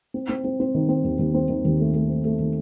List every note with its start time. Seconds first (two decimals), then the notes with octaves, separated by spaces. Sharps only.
0.14 C4
0.29 C4
0.45 C4
0.60 C4
0.75 D#3
0.89 C4
1.04 D#2
1.19 D#2
1.34 C4
1.49 D#3
1.65 D#2
1.80 A3
1.95 A3
2.09 C4
2.25 A3
2.40 D#3